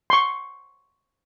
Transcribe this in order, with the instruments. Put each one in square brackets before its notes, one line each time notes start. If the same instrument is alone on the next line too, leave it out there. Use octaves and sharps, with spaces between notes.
[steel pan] C6 C#6